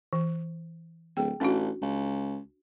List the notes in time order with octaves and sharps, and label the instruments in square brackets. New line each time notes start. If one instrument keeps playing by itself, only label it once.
[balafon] E3
[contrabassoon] D1 [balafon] G#4 G5
[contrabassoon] A1 [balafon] C#4 D4 F#4
[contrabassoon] C#2